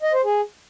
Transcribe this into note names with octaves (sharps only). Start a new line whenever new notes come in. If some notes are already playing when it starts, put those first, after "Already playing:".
D#5
C5
G#4